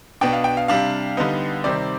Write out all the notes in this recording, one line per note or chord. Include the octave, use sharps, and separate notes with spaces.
B2 B3 D4 G5
F5
G5
F5
C3 G3 D4 F5
D3 G3 B3 D#4
C3 D#3 G3 C4 D5